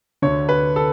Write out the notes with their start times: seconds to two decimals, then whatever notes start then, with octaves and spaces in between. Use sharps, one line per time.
0.22 D2 D3 C#5
0.49 B4
0.76 A4